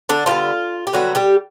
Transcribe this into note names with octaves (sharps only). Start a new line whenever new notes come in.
D3 D4
D3 F3 G3 B3 F4
G4
D3 F#3 G3 B3 F#4
G3 G4